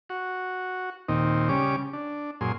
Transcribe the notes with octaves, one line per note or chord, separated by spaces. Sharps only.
F#4
D#2 A#2 C4 D#4
C#3 G3 C#4 D6
D4
F#2 A#2 G#4 C6